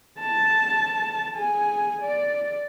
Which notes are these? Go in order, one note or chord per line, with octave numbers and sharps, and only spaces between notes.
A5
G#4 G#5
D5